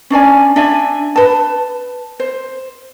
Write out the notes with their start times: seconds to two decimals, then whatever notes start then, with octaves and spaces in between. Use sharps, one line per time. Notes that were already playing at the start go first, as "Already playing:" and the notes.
0.10 C#4 D4 D5 G#5
0.56 D4 D5 E5 G#5
1.16 B4 A5
2.20 C5